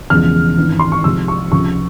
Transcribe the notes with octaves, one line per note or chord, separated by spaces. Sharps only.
E1 E2 C#3 F3 G#3 F6
G#1 G2 E3
C6
C#6
C2 C3 F3 G#3 E6
C#6
C#2 C3 F3 C#6